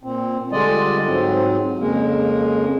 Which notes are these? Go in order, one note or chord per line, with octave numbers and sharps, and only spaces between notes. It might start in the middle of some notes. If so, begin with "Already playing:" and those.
A#2 C4
D3 G3 G#3 F4 D5 D#5
G#2 F#3 C4
F2 C#3 G#3 A#3